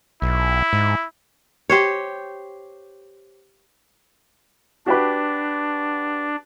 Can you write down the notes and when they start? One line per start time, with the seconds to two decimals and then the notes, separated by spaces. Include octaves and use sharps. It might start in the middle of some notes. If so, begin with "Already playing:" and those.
0.22 B1 E4
0.73 G#2
1.70 G4 C5 C#5
4.86 D4 F#4 G4 B4